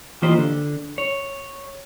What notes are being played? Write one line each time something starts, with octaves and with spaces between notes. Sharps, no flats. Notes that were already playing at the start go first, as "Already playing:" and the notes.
E3 A#3 F4 G4 C5 D#5
D3
C#5